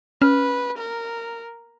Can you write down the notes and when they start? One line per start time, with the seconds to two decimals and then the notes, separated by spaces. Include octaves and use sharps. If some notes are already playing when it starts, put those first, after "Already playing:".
0.22 C#4 B4 F6
0.79 A#4